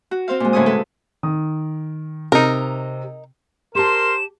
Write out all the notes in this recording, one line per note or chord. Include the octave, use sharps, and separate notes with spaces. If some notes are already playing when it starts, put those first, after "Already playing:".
F#4
C4 C5 F5
A#2 G#3
A2 D3 C#4 G#5 D#6
C3 G#3 A4 B4
D#3 D#6
C3 D#4 A#4
G4 A#4 C5 A5 C6 E7